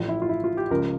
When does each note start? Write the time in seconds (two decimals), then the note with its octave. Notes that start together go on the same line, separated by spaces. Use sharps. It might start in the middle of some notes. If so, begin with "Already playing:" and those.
Already playing: A1 A2 F3
0.08 E4
0.22 F4
0.29 E4
0.44 F4
0.57 G4
0.71 C#2 C#3 F3 A#4